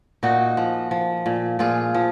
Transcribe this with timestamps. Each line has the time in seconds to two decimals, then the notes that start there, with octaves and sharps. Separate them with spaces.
0.23 A#2 D#4 F#4
0.57 F3
0.91 F3
1.26 A#2
1.59 A#2 F4 G#4
1.94 F3